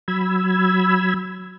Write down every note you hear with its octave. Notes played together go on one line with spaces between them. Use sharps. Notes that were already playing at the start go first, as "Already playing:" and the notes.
F#3 B5 E6 G#6